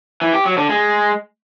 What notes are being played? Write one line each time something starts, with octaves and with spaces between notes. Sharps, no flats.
E3
G4
F#3
D3
G#3